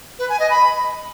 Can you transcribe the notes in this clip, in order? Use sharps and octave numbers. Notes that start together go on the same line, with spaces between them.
B4
G#5
D#5
B5